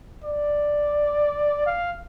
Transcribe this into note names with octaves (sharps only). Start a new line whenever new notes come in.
D5
F5